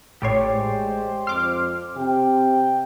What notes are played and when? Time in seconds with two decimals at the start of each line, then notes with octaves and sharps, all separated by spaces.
0.22 A1 A2 G4 C#5 D5 C6
0.52 G#3 C5
1.27 F2 C6 D6 F6
1.96 C3 G5